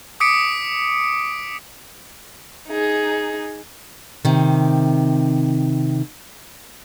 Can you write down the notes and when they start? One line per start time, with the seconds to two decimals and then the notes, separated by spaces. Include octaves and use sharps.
0.20 D6 D#6 B6 C#7 D7
2.68 D#4 G#4
4.25 C3 D#3